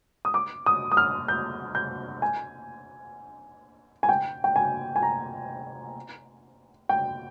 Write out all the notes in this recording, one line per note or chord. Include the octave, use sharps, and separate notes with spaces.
D#6
D6
D#6
D#6
F6
G6
G6
G#5
G#5
G5
G5
G#5
G#5
A#5
G5